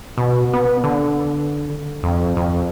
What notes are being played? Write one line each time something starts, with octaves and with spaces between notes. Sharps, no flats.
B2
B3
D3
F2
F2